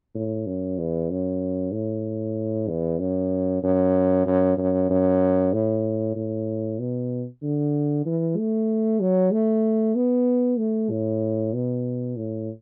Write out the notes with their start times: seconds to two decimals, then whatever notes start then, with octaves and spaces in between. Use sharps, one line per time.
0.15 A2
0.47 F#2
0.79 E2
1.11 F#2
1.73 A2
2.69 E2
2.99 F#2
3.63 F#2
4.26 F#2
4.58 F#2
4.90 F#2
5.53 A2
6.16 A2
6.79 B2
7.43 D3
8.06 E3
8.37 A3
9.01 F#3
9.32 A3
9.95 B3
10.58 A3
10.91 A2
11.54 B2
12.17 A2